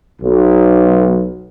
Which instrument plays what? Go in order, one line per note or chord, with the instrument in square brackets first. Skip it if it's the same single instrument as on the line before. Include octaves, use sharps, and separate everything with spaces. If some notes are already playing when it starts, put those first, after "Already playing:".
[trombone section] B1